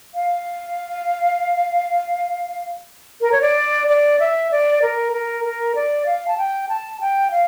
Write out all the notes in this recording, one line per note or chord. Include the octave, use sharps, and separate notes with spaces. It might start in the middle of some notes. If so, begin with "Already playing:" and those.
F5
A#4
C#5
D5
D5
E5
D5
A#4
A#4
A#4
D5
F5
A5
G5
A5
G5
F5